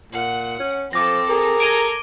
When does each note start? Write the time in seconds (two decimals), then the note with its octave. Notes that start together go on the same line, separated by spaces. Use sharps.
0.12 A#2 F#5
0.60 C#4
0.93 F3 C4 A4 D6 A#6
1.29 G#4 A#4
1.60 A4 A#5 G#6 D7 D#7 G7